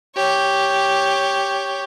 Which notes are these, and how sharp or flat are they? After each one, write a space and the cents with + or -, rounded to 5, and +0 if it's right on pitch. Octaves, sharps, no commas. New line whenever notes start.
G4 +0 C#5 +5